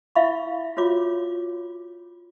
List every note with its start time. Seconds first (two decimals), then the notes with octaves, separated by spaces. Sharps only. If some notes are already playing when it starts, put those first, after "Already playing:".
0.16 E4 E5 F5 B5 C#6
0.77 F4 F#4 C#5 D6